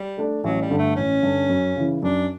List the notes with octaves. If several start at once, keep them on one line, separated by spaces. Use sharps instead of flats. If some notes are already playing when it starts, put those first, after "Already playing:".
Already playing: G3
A3 D4
A1 F#3
G3
G2 D3
A3
A1 C#4
G2 D3
F#2
C#3 E3
F#2 D4